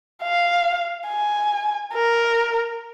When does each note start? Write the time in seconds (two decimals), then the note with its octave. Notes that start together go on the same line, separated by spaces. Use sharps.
0.23 F5
1.08 G#5
1.93 A#4